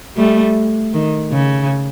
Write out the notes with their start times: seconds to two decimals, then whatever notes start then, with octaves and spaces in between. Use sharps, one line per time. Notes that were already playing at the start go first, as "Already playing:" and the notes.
0.17 G3 A3
0.94 D#3
1.31 C#3